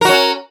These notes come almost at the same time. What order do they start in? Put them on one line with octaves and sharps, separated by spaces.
A#4 F#4 C#4